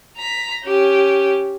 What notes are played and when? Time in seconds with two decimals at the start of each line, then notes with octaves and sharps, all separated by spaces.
0.17 A#5 B6
0.64 C#4 G4